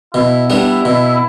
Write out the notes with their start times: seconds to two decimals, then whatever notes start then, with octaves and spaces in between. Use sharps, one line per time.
0.14 B2 E4
0.50 G3 B3 D4
0.85 B2